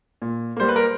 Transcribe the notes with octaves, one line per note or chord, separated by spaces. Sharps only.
A#2
G3 A#3 C5
B4
A#4